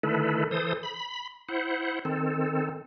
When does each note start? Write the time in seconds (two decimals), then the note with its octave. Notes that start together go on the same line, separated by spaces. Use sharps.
0.03 D3 D#3 A3 E4 A4 B4
0.51 E3 A4 C5 D#6
0.83 B5
1.49 E4 C5 F#5
2.05 D#3 C4 A4